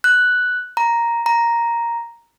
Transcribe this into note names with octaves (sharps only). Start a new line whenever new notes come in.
F#6
A#5
A#5